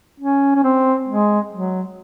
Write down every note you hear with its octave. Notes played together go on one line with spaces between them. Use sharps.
C#4
C#4
C4
G#3
F#3